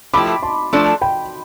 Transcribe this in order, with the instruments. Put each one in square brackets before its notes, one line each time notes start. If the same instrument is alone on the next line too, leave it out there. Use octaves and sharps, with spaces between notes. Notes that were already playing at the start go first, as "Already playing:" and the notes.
[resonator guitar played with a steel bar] F3 A3 E4 G4 [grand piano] B5 D6
[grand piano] A5 C6
[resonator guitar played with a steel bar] F3 A3 D4 A4
[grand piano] G5 B5